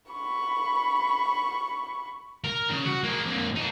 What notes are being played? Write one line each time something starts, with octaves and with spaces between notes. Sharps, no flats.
B5 C#6
A#4
C#3
F#4
A#3 G#4
F2 A#3
D#4 A5